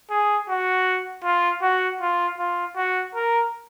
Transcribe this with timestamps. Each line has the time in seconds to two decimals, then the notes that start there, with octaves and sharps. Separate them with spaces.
0.10 G#4
0.49 F#4
1.24 F4
1.62 F#4
2.01 F4
2.38 F4
2.76 F#4
3.15 A#4